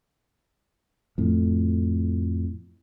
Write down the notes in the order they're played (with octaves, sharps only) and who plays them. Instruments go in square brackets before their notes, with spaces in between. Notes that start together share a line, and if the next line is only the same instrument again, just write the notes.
[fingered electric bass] F2 A2